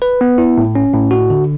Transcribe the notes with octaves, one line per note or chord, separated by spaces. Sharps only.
B4
B3
E4
A2
C#4
A2
F#4
D3